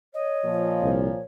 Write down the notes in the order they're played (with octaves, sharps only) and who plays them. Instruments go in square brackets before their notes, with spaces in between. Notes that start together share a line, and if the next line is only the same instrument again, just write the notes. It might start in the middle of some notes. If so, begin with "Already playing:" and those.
[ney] C#5 [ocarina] D#5
[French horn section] A#2 F3
[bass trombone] C2